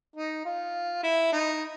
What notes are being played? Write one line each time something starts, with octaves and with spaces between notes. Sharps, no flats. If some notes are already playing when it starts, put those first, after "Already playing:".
D#4
F4
E4
D#4